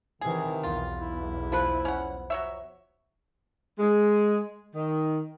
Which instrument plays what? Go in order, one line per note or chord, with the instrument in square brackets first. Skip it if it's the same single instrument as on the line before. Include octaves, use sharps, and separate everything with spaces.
[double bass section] C3 E3 [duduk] D#3 [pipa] G#4
[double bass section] B1 E2 [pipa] F4
[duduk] E4
[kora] F3 B4
[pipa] C#4 F#5
F#3 C#5 E5
[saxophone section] G#3
D#3